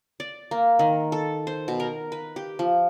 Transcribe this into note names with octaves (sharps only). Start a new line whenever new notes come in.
D5
A#3
D#3
A4
C5
B2
A#4
B4
G4
F3